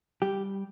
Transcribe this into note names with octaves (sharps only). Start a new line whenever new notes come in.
G3 G4